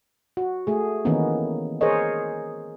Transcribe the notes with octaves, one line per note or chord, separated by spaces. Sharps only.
F#4
A3 G#4
D#3 E3 A#3 B3 C#4 D#4
G#4 A#4 C5 C#5 D#5